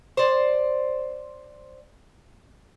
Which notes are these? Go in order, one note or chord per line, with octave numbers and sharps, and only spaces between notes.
C5 D5